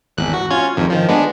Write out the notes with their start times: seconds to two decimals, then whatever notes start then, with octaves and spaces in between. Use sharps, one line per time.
0.17 G#1 E2 F#6
0.34 F#4
0.50 C#4 F4 G#6
0.76 G#1 F2 G#2
0.90 D#3 F3
1.08 G#3 B3 D4